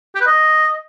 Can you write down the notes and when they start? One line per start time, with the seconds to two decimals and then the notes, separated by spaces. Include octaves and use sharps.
0.15 G4
0.21 B4
0.27 D#5